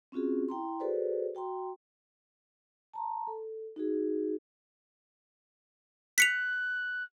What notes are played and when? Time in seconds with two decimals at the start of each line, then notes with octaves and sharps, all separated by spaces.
0.12 C4 C#4 F4 F#4 G#4
0.49 E4 G5 A#5 C6
0.80 F#4 G#4 A4 B4 C5 D5
1.35 F#4 G5 A#5 C6
2.94 A5 A#5 C6
3.27 A4
3.76 D#4 F#4 G#4
6.18 F#6 B6 C#7 F7